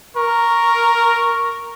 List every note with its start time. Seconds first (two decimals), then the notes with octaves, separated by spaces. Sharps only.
0.17 A#4 C#6